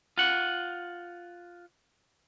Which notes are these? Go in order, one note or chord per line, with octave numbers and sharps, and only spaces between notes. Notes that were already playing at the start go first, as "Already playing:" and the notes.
F4 F#5